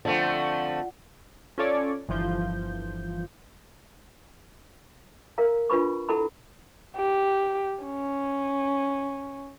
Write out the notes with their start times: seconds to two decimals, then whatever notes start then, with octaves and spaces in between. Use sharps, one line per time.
0.05 D3 F3 A3 C4 F4 D5 F#5
1.58 C#4 F4 A4 C#5 D5
2.09 G1 E3 F3 G6
5.38 A#4 F5 A#5
5.70 D4 F4 B4 B5 C#6
6.09 E4 A4 F#5 A#5 B5
6.97 G4
7.85 C#4